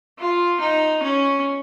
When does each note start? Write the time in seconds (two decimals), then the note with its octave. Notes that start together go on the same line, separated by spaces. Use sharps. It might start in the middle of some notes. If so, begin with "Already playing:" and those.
0.18 F4
0.60 D#4
1.03 C#4